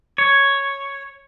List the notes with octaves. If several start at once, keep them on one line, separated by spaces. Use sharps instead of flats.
C#5